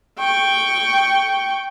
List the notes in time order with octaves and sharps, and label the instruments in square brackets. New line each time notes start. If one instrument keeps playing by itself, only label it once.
[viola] G5 C#6